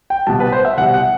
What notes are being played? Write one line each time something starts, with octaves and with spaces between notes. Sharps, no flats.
G5
C2 B2 G3 A5
B4
C5
E5
C2 B2 G3 F#5
F#5